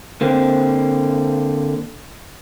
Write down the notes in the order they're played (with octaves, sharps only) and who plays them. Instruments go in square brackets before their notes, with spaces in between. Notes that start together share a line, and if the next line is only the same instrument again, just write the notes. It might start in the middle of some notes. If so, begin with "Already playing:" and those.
[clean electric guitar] D3 A#3 C4